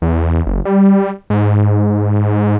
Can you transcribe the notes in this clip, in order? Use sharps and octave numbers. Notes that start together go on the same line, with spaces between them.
E2
F#1
G3
G#2